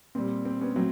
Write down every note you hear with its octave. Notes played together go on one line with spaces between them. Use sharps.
A#2 G3 C4
C4
B3 C#4
A2 F#3 C4